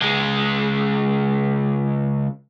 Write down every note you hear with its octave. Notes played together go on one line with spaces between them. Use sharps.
C#2 G#3